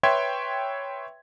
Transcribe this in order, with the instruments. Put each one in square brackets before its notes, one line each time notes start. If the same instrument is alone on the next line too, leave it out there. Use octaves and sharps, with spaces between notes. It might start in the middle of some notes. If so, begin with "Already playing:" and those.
[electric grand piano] B4 C#5 E5 G5 C6 G#6